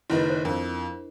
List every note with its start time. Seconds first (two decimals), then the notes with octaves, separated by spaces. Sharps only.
0.10 F#1 D#3 E4 B4 D#5
0.30 C5
0.45 F2 D4 A#4